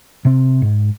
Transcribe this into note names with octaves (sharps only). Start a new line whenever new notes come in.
C3 C4
G#2